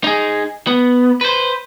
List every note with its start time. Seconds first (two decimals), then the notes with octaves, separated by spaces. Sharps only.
0.04 D#4 G#4
0.67 B3
1.21 B4 C5